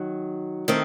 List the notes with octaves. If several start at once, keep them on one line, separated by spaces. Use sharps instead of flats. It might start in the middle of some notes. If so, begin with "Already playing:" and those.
Already playing: D#3 F#3
D#3 A3 C4